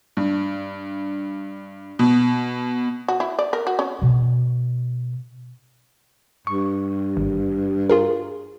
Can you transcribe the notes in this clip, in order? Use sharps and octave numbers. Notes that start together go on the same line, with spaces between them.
G2
B2
F#4
E4
D5
A#4
F#4
C#4
B2 C#4
G2 C#6
G#1
F4 G#4 A#4